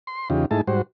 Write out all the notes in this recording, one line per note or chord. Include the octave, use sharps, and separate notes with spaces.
C6
E2 C#3 D#4 F4 G4
G#2 A3 D#4 E4 G#4 A5
G#2 G3 F#4 C5